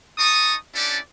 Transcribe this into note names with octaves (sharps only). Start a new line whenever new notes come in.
D#4 A5 C#6 D#6
C#4 D4 E4 G4 A4 D5